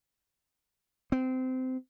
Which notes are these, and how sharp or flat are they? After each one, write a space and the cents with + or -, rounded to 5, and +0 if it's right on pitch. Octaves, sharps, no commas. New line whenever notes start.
C4 -20